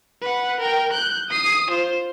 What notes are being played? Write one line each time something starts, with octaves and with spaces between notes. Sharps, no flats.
B4 F#5
A#4 G5
F#6 G6
D#6 C7
F4 C5